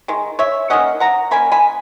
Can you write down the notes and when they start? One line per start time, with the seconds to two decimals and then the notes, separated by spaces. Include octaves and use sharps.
0.08 D#3 G#3
0.39 C#5 E5
0.70 D#3 A#3 C#4 D#5 F#5
1.00 F#5 A#5
1.31 D#3 A#3 C#4 G#5 B5
1.52 G#5 B5